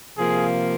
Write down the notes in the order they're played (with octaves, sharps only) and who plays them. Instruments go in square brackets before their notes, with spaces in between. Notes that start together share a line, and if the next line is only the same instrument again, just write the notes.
[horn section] C3 F3 A#3 G#4